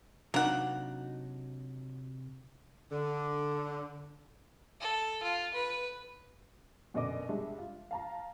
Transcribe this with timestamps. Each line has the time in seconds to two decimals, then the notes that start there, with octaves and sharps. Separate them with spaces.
0.34 C3 F#3 A#3 D4 D#4 F#5
2.92 D3
4.80 A4
5.22 F4
5.54 B4
6.94 F#2 B2 D3 D5 D#5 D6
7.29 G3 G#3 D4 E5
7.58 F4
7.91 F5 A5 A#5